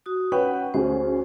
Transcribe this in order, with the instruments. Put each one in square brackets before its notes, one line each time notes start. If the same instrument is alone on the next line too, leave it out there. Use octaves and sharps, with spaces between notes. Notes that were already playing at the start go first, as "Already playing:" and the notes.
[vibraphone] F#4 D#6
[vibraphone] C#4 F#5 C#6 [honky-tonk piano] B4 C#5 G5
[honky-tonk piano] D2 C#4 G#4 [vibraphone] C5